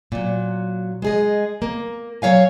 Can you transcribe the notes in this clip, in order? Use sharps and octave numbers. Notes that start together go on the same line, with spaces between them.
A#2 F#3
G#3 G#4 D#5
A#3
F#3 C#5 F5 G#5